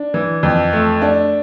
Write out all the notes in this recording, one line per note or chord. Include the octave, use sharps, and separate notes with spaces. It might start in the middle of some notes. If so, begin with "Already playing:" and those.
Already playing: D4
E3
F2
A3
D4